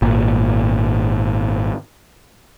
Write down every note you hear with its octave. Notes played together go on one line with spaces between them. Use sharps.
G#1 A#2